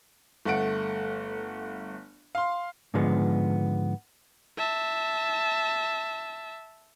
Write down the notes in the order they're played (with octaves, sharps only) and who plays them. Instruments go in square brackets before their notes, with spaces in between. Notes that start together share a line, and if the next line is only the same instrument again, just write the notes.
[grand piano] G1 A3 F#5 D7
F5 C6
[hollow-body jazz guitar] G#2 D3 F3 G#3 B3
[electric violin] E5 A5